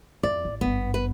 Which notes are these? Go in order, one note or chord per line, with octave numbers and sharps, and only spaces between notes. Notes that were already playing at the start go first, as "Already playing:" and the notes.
F2 D5
A1
G#1 G2 B3
B4